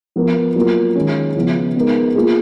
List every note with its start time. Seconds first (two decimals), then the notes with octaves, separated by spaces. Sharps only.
0.16 F3 B3 F4 A#4
0.56 F#3 A#3 F4 A#4
0.96 D#3 G#3 C#4
1.35 C#3 F3 B3 F4
1.75 G#3 B3 D#4 A#4
2.15 A#3 F4 G#4